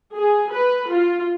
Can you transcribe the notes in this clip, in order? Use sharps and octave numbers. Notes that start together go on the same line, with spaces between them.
G#4
B4
F4